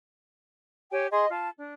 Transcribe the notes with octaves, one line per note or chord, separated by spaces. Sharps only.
G4 C#5 G5 G#5
G#4 D#5 C6
F4 A5
D4